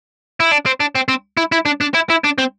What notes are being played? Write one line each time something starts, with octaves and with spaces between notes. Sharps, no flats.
E4
D4
C4
D4
C4
C4
E4
E4
D4
D4
E4
E4
D4
C4